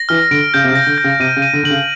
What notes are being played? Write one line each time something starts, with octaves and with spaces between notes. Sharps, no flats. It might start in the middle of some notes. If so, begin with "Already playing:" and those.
Already playing: A#6
E3 F6
D3 D7
C#3 G6
C3
C#3
A#6
D3
G6
C#3
C3 D#7
C#3
D#7
D3
D3 F#7
C#3